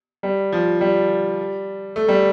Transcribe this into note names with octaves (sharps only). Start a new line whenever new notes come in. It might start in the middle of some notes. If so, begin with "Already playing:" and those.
G3
F3
G3
A3
G3